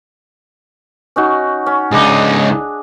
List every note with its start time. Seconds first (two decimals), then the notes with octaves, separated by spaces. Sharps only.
1.16 C#4 D#4 F#4
1.66 C#4
1.92 C#2 D4 D#4 G#4